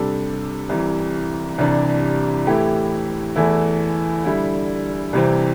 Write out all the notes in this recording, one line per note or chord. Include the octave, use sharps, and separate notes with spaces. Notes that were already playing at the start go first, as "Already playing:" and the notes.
Already playing: C3 G3 D4 A4
C2 C3 E3
C2 C3 E3 G3 D4
A2 E3 A3 E4 G4
E2 E3 A3 E4
D3 G3 E4
C2 C3 E3 C4